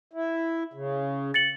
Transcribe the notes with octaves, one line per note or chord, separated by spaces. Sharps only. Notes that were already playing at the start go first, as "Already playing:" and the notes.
E4
C#3
A6 C#7 F#7